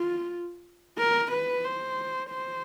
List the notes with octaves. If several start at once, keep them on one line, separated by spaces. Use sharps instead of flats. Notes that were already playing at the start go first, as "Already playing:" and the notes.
Already playing: F4
A#4
B4
C5
C5